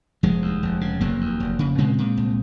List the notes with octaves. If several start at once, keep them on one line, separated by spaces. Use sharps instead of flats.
F1 F3 G#3
D#2
F1
C#3
F1 F#3 A#3
D#2
F1
C#3
A#2 G#3 C4
A#2
C2